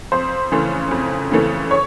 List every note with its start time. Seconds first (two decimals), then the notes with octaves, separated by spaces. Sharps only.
0.12 F2 C5
0.52 C#3 E3 A3
0.91 F2
1.32 C#3 E3 A3
1.71 C#5